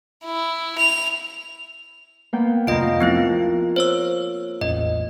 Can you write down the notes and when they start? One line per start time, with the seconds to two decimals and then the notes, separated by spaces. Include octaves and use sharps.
0.24 E4
0.78 F7
2.33 A#3 B3 G5
2.67 C2 F2 A3 F4 A#4 D#5 D7
3.01 F3 B3 C4 E4
3.76 C5 C#5 E6
4.61 A1 E2 D#5